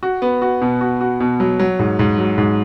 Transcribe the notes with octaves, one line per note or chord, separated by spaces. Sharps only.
F#4
B3
F#4
B2
F#4
F#4
B2
F#3
F#3
G#2
G#2
F#3
G#2